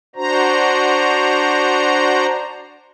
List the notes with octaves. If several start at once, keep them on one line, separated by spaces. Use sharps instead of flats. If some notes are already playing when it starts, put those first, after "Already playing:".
D4 F#4 C5 A#5